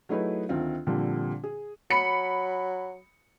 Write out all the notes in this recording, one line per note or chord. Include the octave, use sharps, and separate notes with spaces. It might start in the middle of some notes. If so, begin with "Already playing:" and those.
F#3 A3 D#4 E4 G#4 B4
D2 D#3 C4 F4
A#2 D3 F3 G3 C4
G#4
F#3 B5 C#7